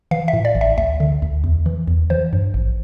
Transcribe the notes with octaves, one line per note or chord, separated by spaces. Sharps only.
E3 F5
E5
A2
D5
A1
E5
D2 E5
D3
D2
E2
E3
E2
E3 C5
G2
A1